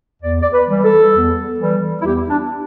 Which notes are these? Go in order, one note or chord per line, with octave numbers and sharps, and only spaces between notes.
E2 D5
D5
B4
E3 G3
A4
E2
E3 G3
E4
E2 G4
D4